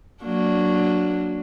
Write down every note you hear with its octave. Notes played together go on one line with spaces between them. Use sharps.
F#3 A#3 D4